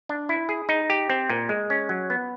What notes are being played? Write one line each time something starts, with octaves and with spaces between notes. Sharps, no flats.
D4
E4
G#4
D#4
G4
C4
A#2
G#3
C#4
F#3
B3